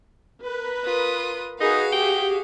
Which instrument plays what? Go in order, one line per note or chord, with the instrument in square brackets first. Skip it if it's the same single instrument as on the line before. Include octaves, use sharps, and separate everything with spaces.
[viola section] A#4 B4
[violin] F4 D#6
[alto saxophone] D#4 [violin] F#4 F5 [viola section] G#4 A#4 B4
[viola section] G4 G#4 [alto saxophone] G5